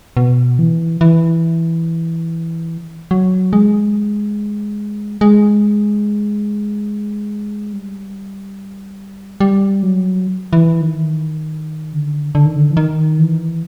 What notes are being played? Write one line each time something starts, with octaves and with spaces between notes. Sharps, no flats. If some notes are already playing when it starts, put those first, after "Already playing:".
B2
E3
E3
F#3
G#3
G#3
G3
G3
F#3
E3
D#3
D3
D3
D#3
D3
E3
D#3
E3